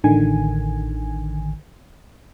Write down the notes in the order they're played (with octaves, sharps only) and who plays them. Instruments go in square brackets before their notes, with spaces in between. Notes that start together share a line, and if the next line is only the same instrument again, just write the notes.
[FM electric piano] A1 D3 D#3 G#5